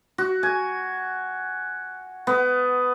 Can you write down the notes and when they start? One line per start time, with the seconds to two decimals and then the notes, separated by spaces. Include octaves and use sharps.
0.18 F#4
0.43 G#5
2.27 B3